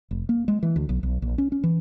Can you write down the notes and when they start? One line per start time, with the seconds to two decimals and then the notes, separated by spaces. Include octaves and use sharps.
0.11 F1
0.29 A#3
0.48 G#3
0.63 E3
0.76 D2
0.89 B1
1.03 B1
1.22 A#1
1.38 C#4
1.52 C#4
1.64 E3